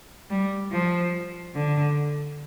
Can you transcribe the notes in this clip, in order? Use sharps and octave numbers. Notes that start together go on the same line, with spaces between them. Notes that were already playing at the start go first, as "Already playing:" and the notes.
G3
F3
D3